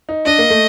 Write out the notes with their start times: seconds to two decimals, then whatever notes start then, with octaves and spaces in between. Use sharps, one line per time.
0.09 D#4
0.26 D4 D#5
0.39 A#3
0.50 A3